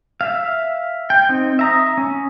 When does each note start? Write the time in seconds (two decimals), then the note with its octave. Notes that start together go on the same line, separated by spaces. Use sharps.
0.21 E5 F5
1.10 G5
1.29 C4 D#4
1.59 E5 A#5 D#6
1.98 C#4